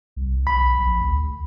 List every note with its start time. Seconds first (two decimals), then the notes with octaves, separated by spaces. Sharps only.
0.16 C2
0.47 B1 B5
0.78 A#1
1.01 D2